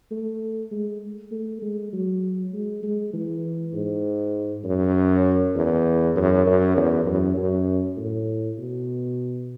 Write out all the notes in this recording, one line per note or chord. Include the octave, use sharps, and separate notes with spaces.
A3
G#3
A3
G#3
F#3
G#3
G#3
E3
G#2
F#2
E2
F#2
F#2
E2
F#2
F#2
A2
B2